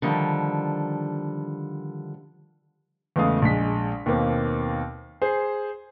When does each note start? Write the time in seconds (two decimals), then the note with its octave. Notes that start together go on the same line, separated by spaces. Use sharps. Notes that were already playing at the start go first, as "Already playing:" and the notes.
0.02 D3 D#3 F3 G3
3.16 E2 C#3 G#3 A3 F5 D#6
3.42 A#1 G#3 B6
4.06 D#2 B2 A#3 C4
5.22 G#4 C5